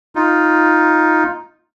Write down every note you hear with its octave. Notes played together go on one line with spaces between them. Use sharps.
D#4 F4